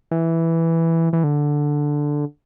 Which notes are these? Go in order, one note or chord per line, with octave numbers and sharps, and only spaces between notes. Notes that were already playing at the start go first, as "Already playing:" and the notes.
E3
E3
D3